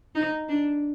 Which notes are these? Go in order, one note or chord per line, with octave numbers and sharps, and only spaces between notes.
D#4
D4